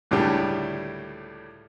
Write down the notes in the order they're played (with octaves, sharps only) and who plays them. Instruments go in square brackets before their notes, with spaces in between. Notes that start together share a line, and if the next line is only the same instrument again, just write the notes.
[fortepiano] C#2 A2 D3 G3 A3